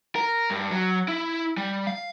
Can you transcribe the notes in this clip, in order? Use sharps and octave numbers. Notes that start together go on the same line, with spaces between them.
A#4
G2
F#3
E4
G3
F5